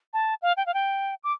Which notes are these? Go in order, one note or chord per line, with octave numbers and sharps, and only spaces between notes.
A5
F5
G5
F5
G5
D6